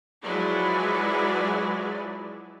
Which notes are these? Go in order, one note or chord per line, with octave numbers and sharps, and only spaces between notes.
F3 F#3 G#3 E4 B4 D5